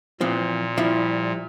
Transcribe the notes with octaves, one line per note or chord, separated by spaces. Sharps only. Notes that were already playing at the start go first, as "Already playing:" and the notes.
A#2 E3 F3 C4
F3 G3 E4